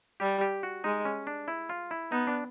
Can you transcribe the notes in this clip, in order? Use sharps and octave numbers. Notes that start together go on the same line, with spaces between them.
G3 G4
G4
F#4
G#3 D#4
C#4
D4
E4
F4
E4
B3 D#4
D4